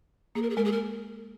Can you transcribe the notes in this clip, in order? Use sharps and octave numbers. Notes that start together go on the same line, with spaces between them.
A#3 G#4
A#4
G#4
G#3 A#4
G#4
A#4